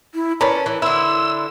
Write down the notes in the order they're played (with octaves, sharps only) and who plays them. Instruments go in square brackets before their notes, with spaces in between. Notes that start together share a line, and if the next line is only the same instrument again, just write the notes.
[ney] E4
[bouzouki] C#4 [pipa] A#4 B4 D5 [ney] A5
[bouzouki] E3
[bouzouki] D3 E4 [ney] C6 [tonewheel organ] E6